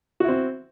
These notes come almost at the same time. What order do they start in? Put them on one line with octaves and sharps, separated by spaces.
F#4 E4 C4